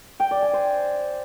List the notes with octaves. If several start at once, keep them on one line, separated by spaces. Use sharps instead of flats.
G5
D5
G#5
C5